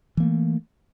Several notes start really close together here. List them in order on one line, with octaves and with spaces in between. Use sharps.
E3 A#3 A3